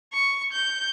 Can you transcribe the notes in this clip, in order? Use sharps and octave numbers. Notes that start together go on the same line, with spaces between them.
C#6
G6